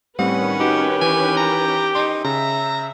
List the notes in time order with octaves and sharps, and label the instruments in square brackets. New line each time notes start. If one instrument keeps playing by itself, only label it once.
[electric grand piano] A2 G3 C4 [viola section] D#3 C#4 B4 [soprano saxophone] F#5
[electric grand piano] D#4 F#4 [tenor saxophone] G4
[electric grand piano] E3 [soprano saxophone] G#5
[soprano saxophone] A#5
[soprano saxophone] D#4 [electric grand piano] C6
[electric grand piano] C#3 [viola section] E5 [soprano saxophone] A#5